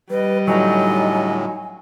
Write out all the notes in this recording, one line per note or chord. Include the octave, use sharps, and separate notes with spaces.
G3 B4 D#5
A2 D3 F#3 D#4 G#5